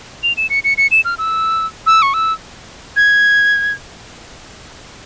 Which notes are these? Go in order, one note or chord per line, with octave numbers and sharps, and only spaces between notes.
F7
E7
C#7
C#7
C#7
E7
F6
E6
E6
C#6
E6
G#6